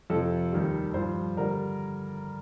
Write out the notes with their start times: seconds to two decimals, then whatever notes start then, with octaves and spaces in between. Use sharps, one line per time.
0.10 F2 C3 F3 A4
0.52 D#2 D#3 G3
0.94 G2 F3 C5
1.37 D3 G3 A#4